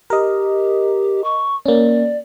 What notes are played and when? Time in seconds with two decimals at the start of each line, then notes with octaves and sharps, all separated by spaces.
0.10 G4 A#4 D#5
1.24 C#6
1.66 A#3 C#4 D5